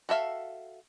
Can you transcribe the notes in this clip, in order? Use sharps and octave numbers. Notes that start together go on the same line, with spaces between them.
F#4 A4 E5 F5